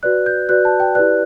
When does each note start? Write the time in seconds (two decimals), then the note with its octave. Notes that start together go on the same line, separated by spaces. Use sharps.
0.03 F#4 B4 D5 F#6
0.26 G6
0.49 F#4 B4 D5 F#6
0.65 A5
0.80 G5
0.95 E4 G4 B4 D5 F#6